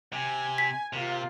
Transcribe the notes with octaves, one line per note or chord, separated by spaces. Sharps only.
C3 G#5
B6
C3 A#3 F4